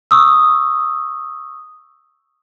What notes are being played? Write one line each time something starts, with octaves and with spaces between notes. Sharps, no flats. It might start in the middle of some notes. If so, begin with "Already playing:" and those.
C#6 D#6 E6